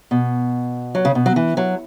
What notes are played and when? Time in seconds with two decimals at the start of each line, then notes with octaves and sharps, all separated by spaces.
0.11 B2
0.95 F#3
1.05 C#3
1.15 B2
1.26 F#3
1.36 E3
1.57 F#3